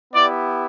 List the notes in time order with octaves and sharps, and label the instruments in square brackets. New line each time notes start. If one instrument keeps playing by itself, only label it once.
[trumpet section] B3 E4 G4 D5